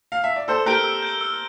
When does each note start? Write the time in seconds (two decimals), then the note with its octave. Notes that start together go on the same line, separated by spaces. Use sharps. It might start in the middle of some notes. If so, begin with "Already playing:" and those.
0.12 F5
0.24 E5
0.36 D5
0.48 A4 C5 E6
0.66 G4 A#4 G6 D7 G7
0.84 E6
1.02 G6 D7 G7
1.21 E6